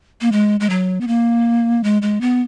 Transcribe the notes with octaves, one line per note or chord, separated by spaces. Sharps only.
A#3
G#3
G#3
F#3
B3
A#3
G#3
G#3
B3